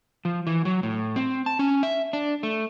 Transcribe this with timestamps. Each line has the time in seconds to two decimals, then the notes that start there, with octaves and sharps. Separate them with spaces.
0.25 F3
0.47 E3
0.65 F#3
0.83 A2
1.16 C4
1.46 A5
1.59 C#4
1.83 E5
2.13 D4
2.43 A3